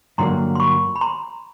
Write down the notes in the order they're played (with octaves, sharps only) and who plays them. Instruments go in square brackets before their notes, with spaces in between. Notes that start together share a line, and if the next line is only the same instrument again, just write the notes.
[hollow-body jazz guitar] G2 D3 F#3 A#3 [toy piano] A#5 C6
[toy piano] C6
B5 C#6
B5
A#5 C6